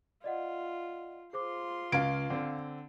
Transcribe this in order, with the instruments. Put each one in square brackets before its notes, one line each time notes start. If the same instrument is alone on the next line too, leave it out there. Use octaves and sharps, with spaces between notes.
[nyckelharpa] F4 [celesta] D5 D#5 F#5
[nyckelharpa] F4 C6 [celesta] G#4 C5 D6
[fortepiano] C#2 [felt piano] F5 D7 [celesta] G#6
[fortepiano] D3 C4